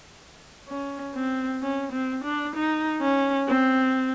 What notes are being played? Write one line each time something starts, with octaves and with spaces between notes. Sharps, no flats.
C#4
C4
C#4
C4
D4
D#4
C#4
C4